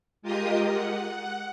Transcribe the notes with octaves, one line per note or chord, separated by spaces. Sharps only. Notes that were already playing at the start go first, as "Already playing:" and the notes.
G#3 F4 G4 A#4 D#5 D#6
F#5